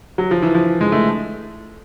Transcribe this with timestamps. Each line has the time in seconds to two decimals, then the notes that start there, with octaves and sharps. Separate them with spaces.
0.18 F#3
0.31 F3
0.42 E3
0.55 F3
0.81 G#3
0.92 A3